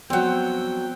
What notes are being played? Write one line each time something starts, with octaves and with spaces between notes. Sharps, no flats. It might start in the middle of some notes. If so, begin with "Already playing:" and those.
G2 F3 F#3 B3 C4 F#5 G5